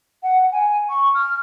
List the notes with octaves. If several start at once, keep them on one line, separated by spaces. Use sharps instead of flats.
F#5
G#5
C#6
F6